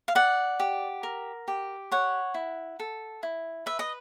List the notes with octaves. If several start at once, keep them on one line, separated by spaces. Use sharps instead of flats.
F5
D5 F#5
G4
A#4
G4
C#5 F#5
E4
A4
E4
B4 E5
D#5